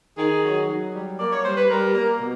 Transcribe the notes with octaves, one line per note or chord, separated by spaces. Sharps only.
D#3 G#4
F#3
F#3
G3
A#3 D5
C#5
G3 C5
B4
G3 A#4
A#3
B2